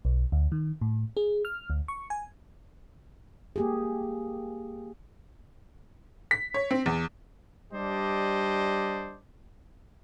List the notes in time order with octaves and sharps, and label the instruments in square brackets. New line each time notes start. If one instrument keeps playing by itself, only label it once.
[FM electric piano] B1
D2
D#3
A2
G#4
F6
D2
C#6
G#5
[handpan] A#3 G4 G#4
[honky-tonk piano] B6
C#5
C4
E2
[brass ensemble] G3 D4 G4 C5 D5 D#5